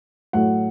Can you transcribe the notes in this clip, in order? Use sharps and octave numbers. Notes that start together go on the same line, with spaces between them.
A2 F#3 A3 F#5